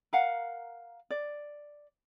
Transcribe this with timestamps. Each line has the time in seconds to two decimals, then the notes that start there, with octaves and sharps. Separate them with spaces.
0.13 A#4 F5 F#5
1.10 D5